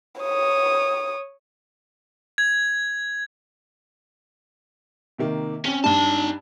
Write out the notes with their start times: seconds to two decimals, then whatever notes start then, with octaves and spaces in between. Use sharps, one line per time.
0.22 C#5 D#6
2.38 G#6
5.18 C3 D#3 A#3
5.65 C4 C#4
5.84 G2 D4 D#4 A5